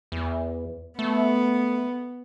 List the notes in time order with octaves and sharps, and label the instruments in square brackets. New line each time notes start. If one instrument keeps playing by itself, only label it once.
[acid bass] E2
[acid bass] A3 [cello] B3